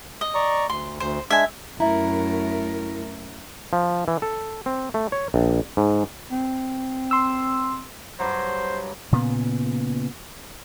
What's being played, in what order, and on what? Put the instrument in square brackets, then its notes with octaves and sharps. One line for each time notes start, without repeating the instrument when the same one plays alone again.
[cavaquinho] D#5
[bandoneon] D5 A#5 C#6
[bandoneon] D2 [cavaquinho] C6
[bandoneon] D2 [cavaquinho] C5
[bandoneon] G#3 D4 [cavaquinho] E5 G#5
[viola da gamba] F#2 [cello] A3 A#4 [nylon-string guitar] E4 [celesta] E5 A#5
[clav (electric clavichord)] F3
E3
A4
C4
A3
C#5
A#1
G#2
[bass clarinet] C4
[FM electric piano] C6 E6
[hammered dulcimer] G2 F#3 [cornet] C5
[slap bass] A#2 C#3 B3